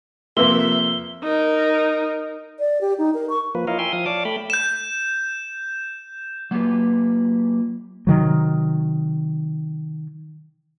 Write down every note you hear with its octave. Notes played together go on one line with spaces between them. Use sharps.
F2 C3 A#3 F#4 B4 E5 C6 G7
D#4 A#4
D5
G4
D#4
A#4
C#6
F3 A#3 B4
E4 F4 A#4 C#5 D#5 F5
E5 G5 G#5 C6
F3 F5 D#6
C#5 D5 F5 A5 D6
A3 G5 B5
G6 E7
F#3 A#3 F4 G4 B4
C3 D#3 F#3